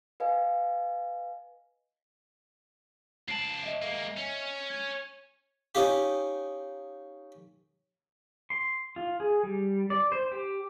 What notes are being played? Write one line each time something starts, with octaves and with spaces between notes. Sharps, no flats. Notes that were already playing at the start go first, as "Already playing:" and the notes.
B4 D#5 F5 G#5
C#2 A5 C7 D7 F#7
D#5 E5
G#3 A#3
C#4
G#6 D#7
C#4 D#4 F4 G4
C6
F4
G#4
G3
D5
C5
G4